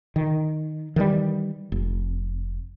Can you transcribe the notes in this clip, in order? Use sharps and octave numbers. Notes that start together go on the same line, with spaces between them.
D#3
D#3 E3 F#3 G3
F1